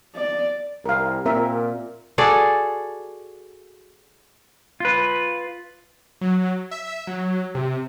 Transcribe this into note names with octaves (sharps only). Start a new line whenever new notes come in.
D5
C2 A#4 F5
A#2 C4 A#4 E5
F#4 G#4 A4 D5
F4 B4
F#3
E5
F#3
C3